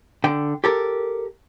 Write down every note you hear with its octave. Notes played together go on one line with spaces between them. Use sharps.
D3 G5
G4 A4 A#4